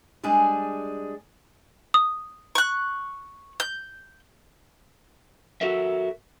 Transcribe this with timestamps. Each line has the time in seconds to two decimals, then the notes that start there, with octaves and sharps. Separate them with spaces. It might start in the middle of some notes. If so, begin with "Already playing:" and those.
0.23 G3 G#3 D4 G#4
1.94 D#6
2.55 C#6 F#6
3.60 G6
5.61 F#4 A4 A#4 E5